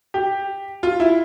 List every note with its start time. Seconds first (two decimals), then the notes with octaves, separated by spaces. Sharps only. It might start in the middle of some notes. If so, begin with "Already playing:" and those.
0.14 G4
0.83 F4
1.00 E4